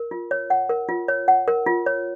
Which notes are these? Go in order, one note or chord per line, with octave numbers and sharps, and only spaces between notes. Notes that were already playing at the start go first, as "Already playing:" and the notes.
Already playing: A#4
F4
C#5
F#5
A#4
F4
C#5
F#5
A#4
F4
C#5